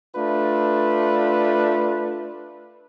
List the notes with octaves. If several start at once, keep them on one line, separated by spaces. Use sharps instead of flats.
A3 D4 F4 B4